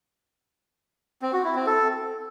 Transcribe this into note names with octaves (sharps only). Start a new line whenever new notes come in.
C4
F#4
E4
C4
A4